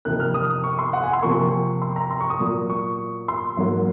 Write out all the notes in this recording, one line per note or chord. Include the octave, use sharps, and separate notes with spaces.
F2 C3 D#3 A#3 F#6
F6
D#6
C#6
C6
F#5
G#5
C6
C3 F3 A#3 C#6
C6
A#5
C6
C#6
D#6
A#2 F#3 A#3
C#6
C6
G#2 F#3 A#3